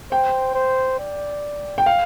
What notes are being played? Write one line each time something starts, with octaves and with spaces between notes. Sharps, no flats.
C5 G5
C5
D5
G5
F5